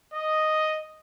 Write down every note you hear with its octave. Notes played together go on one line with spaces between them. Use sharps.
D#5